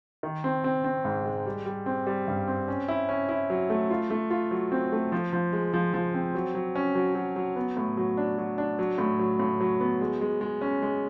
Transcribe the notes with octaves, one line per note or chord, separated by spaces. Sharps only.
D#3
C4
C4
C4
G#2
G#3
G3
G3
C4
G3
G2
C4
C#4
E4
C#4
E4
F#3
A3
F4
A3
F4
F#3
C4
A3
F3
F3
G#3
F3
F3
C4
F#3
F#3
C#4
F#3
F#3
F#3
B3
A2
F#3
D4
F#3
D4
F#3
A2
F#3
A2
F#3
B3
G#3
G#3
G#3
C#4
G#3